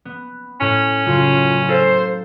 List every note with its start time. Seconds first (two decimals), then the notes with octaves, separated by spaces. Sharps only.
0.05 B3
0.61 A2 C#4
1.06 F#1 F4
1.69 A4 A#4 C5 F5